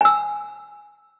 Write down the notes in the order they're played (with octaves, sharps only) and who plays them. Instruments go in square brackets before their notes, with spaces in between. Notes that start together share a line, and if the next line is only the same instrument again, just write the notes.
[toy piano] G#5 E6